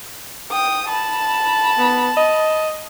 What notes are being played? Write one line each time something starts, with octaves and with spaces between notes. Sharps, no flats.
G5 D#6
A5 B5
B3
D#5